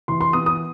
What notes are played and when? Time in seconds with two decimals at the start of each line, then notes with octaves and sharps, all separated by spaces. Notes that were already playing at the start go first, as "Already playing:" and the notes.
0.08 E3 C6
0.21 C6
0.33 B3 D#6
0.46 D#6